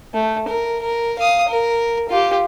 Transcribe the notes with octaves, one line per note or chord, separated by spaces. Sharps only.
A3
A#4
A#4
F5 D#6
A#4
F4 G4